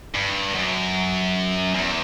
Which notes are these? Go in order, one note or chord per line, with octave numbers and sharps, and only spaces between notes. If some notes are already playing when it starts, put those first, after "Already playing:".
G2
F#2
E2